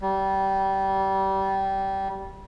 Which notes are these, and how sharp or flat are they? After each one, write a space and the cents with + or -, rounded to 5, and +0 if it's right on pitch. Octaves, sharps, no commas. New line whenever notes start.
G3 -20